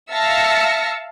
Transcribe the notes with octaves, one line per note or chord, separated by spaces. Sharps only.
E5 F5 A5 E6 A#6 C#7